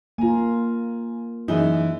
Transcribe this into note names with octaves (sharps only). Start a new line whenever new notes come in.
A#3 F4 G#5 A#5
F#2 E3 C#4 D#4 G#4 G7